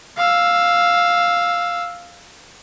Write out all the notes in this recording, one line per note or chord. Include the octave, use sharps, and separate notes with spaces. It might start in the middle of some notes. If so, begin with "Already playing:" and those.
F5 E6